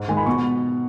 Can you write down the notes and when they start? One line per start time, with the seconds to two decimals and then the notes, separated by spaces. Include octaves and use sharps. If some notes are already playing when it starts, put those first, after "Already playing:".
Already playing: G#2
0.08 D#3 G#3 G#5
0.17 B5
0.26 B2 C#6